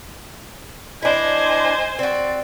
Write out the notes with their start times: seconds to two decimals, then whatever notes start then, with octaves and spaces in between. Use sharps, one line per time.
1.02 D4 E4 C5 D#5 G#5
1.99 C4 F#4 D5